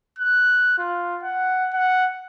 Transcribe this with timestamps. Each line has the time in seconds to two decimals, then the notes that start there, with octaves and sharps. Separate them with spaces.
0.19 F#6
0.78 F4
1.23 F#5
1.74 F#5